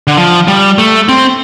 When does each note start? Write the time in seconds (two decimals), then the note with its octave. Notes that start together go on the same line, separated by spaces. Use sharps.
0.07 D3
0.17 F3
0.48 G3
0.78 A3
1.09 C4